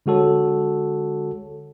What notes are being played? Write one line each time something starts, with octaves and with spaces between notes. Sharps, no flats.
D3 G#3 F#4 A4 C#5